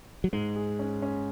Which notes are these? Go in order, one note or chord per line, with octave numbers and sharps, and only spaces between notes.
F#3
G#2 G#3
G#4
C#4
C#4